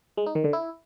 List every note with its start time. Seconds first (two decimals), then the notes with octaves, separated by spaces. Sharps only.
0.17 G#3
0.26 D#4
0.35 D#3
0.44 D3
0.53 E4